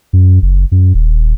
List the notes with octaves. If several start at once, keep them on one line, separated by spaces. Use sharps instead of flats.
F#2
F#1
F#2
D#1